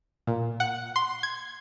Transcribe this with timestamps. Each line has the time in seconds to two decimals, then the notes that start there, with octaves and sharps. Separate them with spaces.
0.27 A#2
0.60 F#5
0.96 C6
1.23 G#6